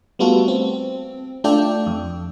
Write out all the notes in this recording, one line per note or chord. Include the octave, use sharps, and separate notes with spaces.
G3 A3 B3 F4 F#4 A4
C4
A3 D4 F4 A4 D5 G5
F2